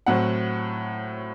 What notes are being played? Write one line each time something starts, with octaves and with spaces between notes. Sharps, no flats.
A2 F#3 C4 F#5